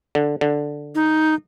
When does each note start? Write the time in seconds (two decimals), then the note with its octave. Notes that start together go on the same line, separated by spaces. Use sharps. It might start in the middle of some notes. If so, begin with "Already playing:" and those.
0.15 D3
0.41 D3
0.95 D#4